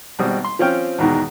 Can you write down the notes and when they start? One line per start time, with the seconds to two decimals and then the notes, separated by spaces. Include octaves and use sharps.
0.19 G#1 B2 G3 C4 D#6
0.44 C6
0.59 F3 C4 C#4 G5 F6
0.98 E2 G#2 B2 D#3